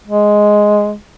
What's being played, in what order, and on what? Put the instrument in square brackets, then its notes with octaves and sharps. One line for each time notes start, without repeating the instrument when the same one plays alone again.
[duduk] G#3